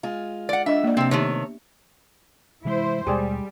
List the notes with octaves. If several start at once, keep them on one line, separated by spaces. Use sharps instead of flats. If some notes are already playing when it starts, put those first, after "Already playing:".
G#3 F4
D5 F#5
D4 D#5 E5
A#3 D5
C3 F3 C4
C3 D#3 A3 B3 G4 C#5
C3 E3 G#3 E4 C5
D#2 B2 G3 G#3 G4 G#4 D5